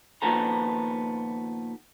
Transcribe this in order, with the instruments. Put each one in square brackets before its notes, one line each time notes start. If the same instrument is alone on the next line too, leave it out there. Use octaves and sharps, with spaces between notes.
[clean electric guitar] A#2 D#3 F3 B3 A4 A#5